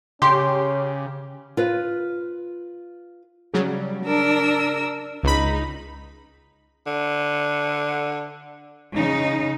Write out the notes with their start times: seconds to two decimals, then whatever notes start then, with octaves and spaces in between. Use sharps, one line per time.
0.22 C#3 C#4 G4 C6
1.57 F4 B4
3.54 C#3 F#3 G3
4.04 D4 A#4 E6
5.23 C#2 D#4 B5
6.87 D3
8.94 C#3 D#4